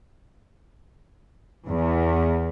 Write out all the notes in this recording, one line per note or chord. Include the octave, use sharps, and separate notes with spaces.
E2